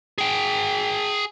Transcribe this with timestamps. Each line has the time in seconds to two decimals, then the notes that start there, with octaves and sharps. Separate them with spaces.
0.18 G#4 G5